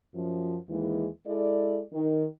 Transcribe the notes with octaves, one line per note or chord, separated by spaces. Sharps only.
F#2 F3
D#2 E3 G#3
G#3 E4 A4 D5
D#3